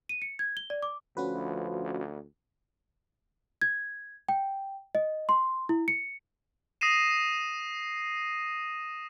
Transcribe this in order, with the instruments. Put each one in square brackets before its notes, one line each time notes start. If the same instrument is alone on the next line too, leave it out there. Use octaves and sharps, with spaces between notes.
[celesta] D#7
C#7
G#6
G7
D5
D6
[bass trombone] D2 [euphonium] F3 [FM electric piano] C#4 F#4 B4
[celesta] G#6
G5
D#5
C6
E4
C#7
[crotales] D#6 A#6 C7 D#7 E7